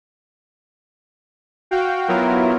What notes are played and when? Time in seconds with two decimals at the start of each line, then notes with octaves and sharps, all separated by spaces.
1.71 F#4 F5 G5
2.08 F#3 B3 E4 F4 A#4